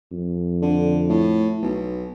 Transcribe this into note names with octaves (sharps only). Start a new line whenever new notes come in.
F2
D3
A2
B1